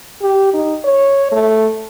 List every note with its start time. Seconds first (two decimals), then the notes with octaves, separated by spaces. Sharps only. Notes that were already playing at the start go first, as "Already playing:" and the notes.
0.22 G4
0.54 D#4
0.85 C#5
1.32 A3